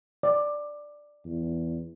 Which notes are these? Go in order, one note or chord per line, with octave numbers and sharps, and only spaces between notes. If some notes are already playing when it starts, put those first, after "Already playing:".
D5
E2